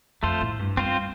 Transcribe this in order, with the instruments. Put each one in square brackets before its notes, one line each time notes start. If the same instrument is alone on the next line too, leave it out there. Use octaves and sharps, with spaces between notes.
[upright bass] F2 [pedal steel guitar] A3 F4 A4 C5
[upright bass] A2
G2
[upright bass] G2 [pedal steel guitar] C4 F4 C5